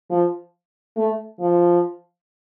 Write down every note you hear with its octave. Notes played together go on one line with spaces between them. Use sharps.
F3
A3
F3